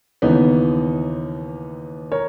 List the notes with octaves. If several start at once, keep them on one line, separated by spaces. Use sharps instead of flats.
D#2 C#3 E3 B3 D#4
A#4 C#5